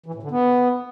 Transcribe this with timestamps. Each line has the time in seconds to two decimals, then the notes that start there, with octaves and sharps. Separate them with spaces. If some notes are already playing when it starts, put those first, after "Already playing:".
0.06 E3
0.15 A2
0.23 D3
0.31 B3